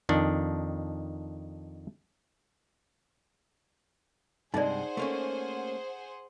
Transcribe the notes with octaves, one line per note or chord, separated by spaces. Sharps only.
F2 D#3 D4
G2 C3 G#3 D#4 G#4 C5 D5 F#5
A3 A#3 C#4